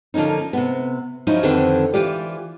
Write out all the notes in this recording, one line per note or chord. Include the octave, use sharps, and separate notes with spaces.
D3 F3 A#3 C#4 D#4
C3 B3
F3 F#3 C#4 D#4 E4
F2 D3 D#3 C4 D4 B4
E3 F4 G4 D5